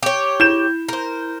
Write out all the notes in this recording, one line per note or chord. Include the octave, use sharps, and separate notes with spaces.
G4 C#5
E4 G6 E7
A#4 C5